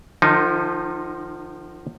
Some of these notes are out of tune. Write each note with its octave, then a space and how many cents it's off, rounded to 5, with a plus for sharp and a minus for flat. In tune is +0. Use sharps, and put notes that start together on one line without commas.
D3 +45 F3 -5 D#4 +0